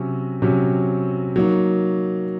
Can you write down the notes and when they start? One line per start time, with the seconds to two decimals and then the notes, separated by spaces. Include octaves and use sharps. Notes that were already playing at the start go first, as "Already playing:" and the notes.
Already playing: C3 F#3 C#4
0.42 C3 F#3 C#4
1.36 F#3 A#3 D#4